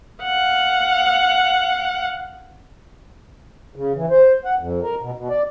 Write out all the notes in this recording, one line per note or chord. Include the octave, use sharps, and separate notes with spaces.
F5 F#5
C#3
E3
C5
F#5
F2
A#4
B2
B2
D5